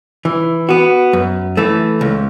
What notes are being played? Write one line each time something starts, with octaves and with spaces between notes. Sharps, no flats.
E3
B3 F#4
F#2
E3 A3
C#2